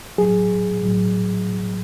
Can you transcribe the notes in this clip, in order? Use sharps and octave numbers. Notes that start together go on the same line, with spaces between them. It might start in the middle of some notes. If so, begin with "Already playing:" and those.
A2 F#3 G#4
A2 F#3